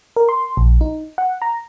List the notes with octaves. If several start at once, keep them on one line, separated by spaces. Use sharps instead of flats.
A#4
C6
A#1
D#4
F#5
A#5